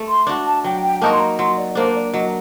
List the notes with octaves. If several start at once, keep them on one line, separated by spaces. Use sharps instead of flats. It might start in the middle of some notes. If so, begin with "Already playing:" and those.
Already playing: A3
C6
D4 F#4
A5
F#3 G5
G5
A#3 D#4 F#4 A5
C6
A#5
F#3 C6
D5
A#3 D4 C5
D5
F#3 D#5